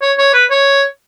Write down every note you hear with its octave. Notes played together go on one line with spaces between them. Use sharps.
C#5
C#5
B4
C#5